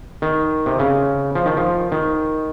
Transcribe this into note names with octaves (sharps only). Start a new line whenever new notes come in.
D#3
C3
C#3
F3
D#3
F3
D#3